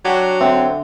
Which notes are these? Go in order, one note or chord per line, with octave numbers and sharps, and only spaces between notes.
F#3 D4 F#4 G4
D3 C4 E5